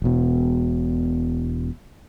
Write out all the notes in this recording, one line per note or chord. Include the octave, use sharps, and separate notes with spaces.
E1 B2